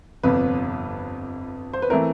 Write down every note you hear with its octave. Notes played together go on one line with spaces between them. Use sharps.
G1 F2 C3 B4
C5
B4
E3 A3 C4 A#4